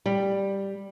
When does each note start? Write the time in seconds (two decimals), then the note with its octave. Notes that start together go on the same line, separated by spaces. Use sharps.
0.06 G3